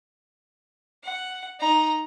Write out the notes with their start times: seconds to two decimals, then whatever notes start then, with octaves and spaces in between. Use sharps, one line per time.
1.04 F#5
1.60 D#4 A#5